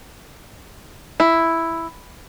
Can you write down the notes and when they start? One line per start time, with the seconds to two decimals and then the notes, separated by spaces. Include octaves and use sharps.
1.20 E4